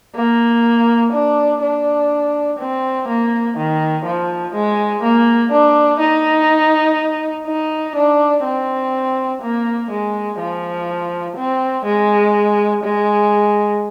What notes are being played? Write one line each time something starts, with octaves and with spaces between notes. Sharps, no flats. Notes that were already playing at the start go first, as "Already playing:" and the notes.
A#3
D4
D4
C4
A#3
D#3
F3
G#3
A#3
D4
D#4
D#4
D4
C4
A#3
G#3
F3
C4
G#3
G#3